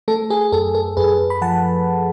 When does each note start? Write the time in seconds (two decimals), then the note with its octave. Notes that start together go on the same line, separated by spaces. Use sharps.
0.08 A3 A4
0.30 G#4
0.52 F#2 A4
0.75 A4
0.97 F#2 G#4 B4
1.30 B5
1.41 F3 F#5 A5